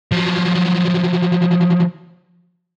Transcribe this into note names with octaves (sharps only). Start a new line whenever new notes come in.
F3 F#3